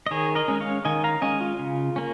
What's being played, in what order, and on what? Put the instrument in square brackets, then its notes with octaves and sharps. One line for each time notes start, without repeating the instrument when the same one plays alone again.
[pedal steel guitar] D#5
D#3 G#4 C#5
A#4 D#5
G#3 C#4
C#5 F5
D#3 D#5 G#5
F5 A#5
G#3 C#4 D#5 G#5
F4
C#3
A#3 C#4